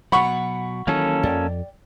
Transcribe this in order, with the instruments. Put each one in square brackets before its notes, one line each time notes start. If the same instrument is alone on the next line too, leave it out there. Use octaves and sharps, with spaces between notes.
[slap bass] B2 F#3 [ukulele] F#5 [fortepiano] B5 C#6
[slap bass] D#3 E3 F#3 [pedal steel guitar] A#3 C#4 A4
[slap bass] F2 [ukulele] D5 G5